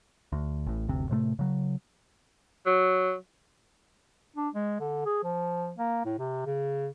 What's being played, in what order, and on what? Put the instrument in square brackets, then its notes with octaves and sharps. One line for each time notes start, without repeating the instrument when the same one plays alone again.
[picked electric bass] D2
A1 A2
F#1 D2 C3
A2 C3 F#3 A3
C#3 F#3
[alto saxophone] F#3
[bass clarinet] D4
G#3
D3
G#4
F3
A#3
A2
C3
C#3